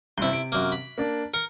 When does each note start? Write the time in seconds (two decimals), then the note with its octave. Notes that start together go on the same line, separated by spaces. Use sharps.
0.18 G2 C3 E4 C6
0.32 C3 D7
0.52 F#2 A#3
0.72 B5
0.98 A#3 D4
1.34 A#4 C#7